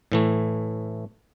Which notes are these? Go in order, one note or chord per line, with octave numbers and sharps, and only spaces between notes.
A2 E3 A3